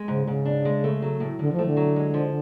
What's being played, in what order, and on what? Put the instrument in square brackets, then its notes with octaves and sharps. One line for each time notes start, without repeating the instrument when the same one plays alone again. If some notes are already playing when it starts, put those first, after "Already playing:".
Already playing: [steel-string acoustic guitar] G#3
[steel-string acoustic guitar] G#2 [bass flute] C#3
[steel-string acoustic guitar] G#2 [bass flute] C#3
[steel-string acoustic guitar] D4
G#3
A3
F#3
A2
[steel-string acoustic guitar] A2 [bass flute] D3
[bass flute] F3
[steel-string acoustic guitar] A3
[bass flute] D3
[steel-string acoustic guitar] F#3
G#3
F3